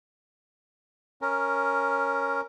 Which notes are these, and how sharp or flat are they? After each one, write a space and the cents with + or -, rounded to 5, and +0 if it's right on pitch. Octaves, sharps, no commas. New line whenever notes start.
C#4 +0 A#4 +0